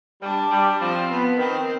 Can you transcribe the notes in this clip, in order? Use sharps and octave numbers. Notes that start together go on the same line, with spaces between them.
G3 D4
G3
F3 C4
B3
D#3 C4